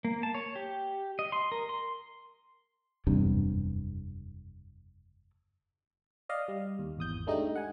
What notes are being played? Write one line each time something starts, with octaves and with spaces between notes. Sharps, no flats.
A#3
A5
C#5
G4
D#5
C6
A#4
C6
F#1 E2 G2 C3
D5 D#5 F5
G3
D#2
G#1 E2 D#6 G6
G#3 A3 D4 D#4 G4 D#5
F#5 G#5